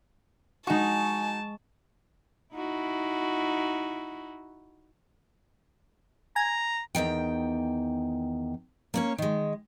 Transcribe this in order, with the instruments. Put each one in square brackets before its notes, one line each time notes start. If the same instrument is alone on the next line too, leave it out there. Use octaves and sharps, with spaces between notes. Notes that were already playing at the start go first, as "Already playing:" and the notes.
[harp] G#3 C#6 [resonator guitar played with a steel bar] D#4 F#4 [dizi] G#5 [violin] A5
[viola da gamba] D#4 E4 F#4
[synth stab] G#5 [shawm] A#5
[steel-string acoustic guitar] E2 G2 D#3 G5
A#3 C#4 C#5
D#3 G#3